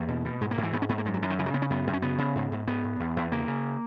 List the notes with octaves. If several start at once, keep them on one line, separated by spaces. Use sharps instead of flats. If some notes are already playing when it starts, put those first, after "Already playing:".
Already playing: E2 A#3
B2
B2
G#2 G#3
A#3
G#2
E3
G#2 B3
C#4
G#2 B3
A#3
F#2 G#3
F#3
F#2 E3
D#3
C#3 E3
F#3
C#3 B3
C#4
F#2 B3
F#2
C#4
C#3 B3
C#3
G#2
G#2
G#2 B3
G#2
E2
E2
C#3 A#3
C#3